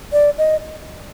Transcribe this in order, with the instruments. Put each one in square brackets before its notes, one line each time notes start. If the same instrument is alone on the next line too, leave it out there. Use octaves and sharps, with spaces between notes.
[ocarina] D5
D#5